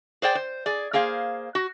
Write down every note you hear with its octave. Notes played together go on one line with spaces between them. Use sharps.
G#4 C5 D5 G5
C5
G#4 D5
A#3 G#4 C5 F5
F#4